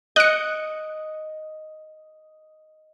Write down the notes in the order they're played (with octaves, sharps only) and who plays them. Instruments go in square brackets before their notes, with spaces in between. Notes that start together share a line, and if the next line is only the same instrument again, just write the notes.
[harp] D#5 [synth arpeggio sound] F#6 C#7